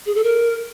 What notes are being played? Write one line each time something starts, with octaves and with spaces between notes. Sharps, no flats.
G#4
A4
A#4